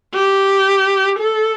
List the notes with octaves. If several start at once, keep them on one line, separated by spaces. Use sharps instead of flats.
G4
A4